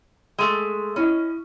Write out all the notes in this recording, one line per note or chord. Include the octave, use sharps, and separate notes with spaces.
G#3 A3
C#4 E4 D#5